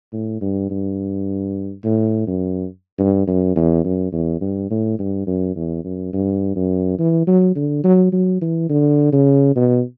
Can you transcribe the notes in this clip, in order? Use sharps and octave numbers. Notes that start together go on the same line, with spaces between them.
A2
G2
G2
A2
F#2
G2
F#2
E2
F#2
E2
G2
A2
G2
F#2
E2
F#2
G2
F#2
E3
F#3
D3
F#3
F#3
E3
D3
C#3
B2